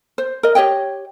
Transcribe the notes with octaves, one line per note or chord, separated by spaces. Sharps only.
C5
A#4 D#5
G4 C#5 D#5 G5